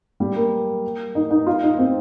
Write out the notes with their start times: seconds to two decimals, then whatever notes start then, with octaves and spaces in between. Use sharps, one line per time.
0.20 G3
0.36 A#3
1.15 D#4
1.31 D#4
1.47 F4
1.63 D#4
1.78 C4